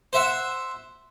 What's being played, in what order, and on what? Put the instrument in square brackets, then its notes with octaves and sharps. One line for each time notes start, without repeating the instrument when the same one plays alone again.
[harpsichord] C5 E5 F#5